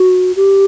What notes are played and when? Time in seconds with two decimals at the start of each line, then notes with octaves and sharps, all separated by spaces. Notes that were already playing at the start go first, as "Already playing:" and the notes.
Already playing: F#4
0.36 G4